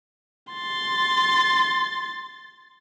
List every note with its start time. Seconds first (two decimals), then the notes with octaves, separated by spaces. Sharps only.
0.53 C6 A6